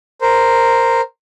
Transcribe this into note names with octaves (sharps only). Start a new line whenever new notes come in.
A#4 C5